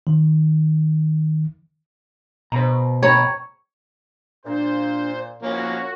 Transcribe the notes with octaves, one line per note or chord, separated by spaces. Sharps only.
D#3
B2 C5 A#5
C#5 G5 A#5 B5
A#2 D4 C5
F3 A#3 C#4 F#4 A#4